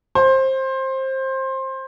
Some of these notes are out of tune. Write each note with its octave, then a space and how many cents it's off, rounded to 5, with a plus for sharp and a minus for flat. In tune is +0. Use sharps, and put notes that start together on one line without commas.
C5 +20